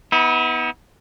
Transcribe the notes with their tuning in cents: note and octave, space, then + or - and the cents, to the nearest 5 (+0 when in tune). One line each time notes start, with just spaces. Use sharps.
B3 +0 E4 -45